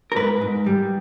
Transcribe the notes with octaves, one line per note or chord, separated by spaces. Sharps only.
A#4
G#2 B4
G#2
G3